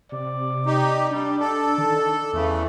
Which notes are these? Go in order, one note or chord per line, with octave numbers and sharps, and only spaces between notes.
C3 D5
D#4 G4
G3 D4
A4
D#3
E2 C#3 E3 A3